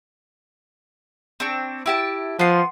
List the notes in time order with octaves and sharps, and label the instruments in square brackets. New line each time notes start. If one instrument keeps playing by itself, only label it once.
[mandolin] C4 D4 C#6
E4 G4 A5
[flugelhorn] F3 [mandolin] B3 C6